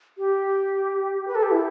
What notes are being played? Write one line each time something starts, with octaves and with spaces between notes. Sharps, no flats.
G4
B4
A4
G4
E4